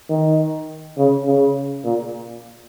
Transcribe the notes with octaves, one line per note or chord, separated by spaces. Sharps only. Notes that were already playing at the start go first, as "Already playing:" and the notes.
D#3
C#3
C#3
A#2